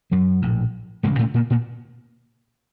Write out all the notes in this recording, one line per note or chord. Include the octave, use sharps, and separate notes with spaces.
F#2 F#3
A#1 A2
E1 D2 G#2 C#3 G#3
A2 A3
A#2 A#3
A#2 A#3